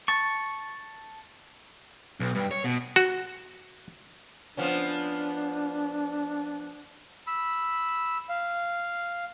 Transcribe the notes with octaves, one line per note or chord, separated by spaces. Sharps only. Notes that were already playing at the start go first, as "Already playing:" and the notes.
A5 C#6
B1
G2
C#5
B2
F#4
F3 B3 C#4 D4
B5 E6
F5